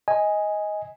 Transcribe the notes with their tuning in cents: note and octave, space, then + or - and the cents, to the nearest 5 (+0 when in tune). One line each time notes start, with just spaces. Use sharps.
D#5 +15 G#5 -5